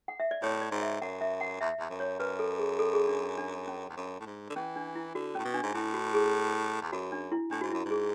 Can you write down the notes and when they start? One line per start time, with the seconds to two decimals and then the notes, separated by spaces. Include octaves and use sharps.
0.08 F#5
0.20 E5
0.31 D5
0.42 A2 C#5
0.62 D5
0.71 G#2
0.82 E5
1.01 F#2 F#5
1.21 E5
1.41 F#5
1.61 E2 E5
1.79 E2
1.90 F#2
2.00 C#5
2.20 F#2 B4
2.39 A4
2.59 G#4
2.79 A4
2.94 G#4
3.08 D4
3.23 D4
3.38 D4
3.68 C#4
3.90 E2
3.97 F#2
4.21 A2
4.26 G#2
4.50 D3
4.56 E3 C#4
4.76 D4
4.95 E4
5.15 D3 F#4
5.35 A2 C#4
5.45 B2
5.54 D4
5.63 G#2
5.74 A2 E4
5.94 F#4
6.14 G#4
6.82 E2
6.92 F#2 F#4
7.12 D4
7.32 E4
7.51 A2 D4
7.61 G#2 F#4
7.71 F#2 E4
7.85 G#2
7.91 G#4